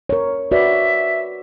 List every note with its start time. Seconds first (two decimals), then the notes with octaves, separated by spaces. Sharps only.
0.09 A#4 C#5
0.52 F#4 B4 D5 E5